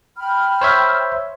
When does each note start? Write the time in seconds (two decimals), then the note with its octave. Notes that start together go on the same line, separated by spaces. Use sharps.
0.17 G5 B5 F6
0.61 C5 C#5 E5